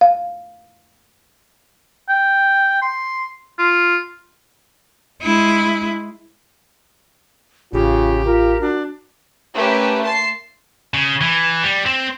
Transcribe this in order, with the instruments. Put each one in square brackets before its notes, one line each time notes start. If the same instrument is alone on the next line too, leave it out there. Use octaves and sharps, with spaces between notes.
[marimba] F5
[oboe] G5
C6
F4
[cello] G#3 E4
[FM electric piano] A1 [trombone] C#3 [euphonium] F4 [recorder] G4
[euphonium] F4 [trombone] A#4
[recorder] D4 [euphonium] F#4
[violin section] A3 A#3 C#4 G4 B4
A5 C6 C7
[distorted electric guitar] C#3
E3
G3
C4